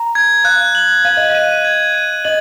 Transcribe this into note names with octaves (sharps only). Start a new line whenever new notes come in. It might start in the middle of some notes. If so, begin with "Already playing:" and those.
Already playing: A#5
G#6
F5 F#6
F#7
F5 D#7
D#5
F5 D#7
G#6
D#7
D#5 F#7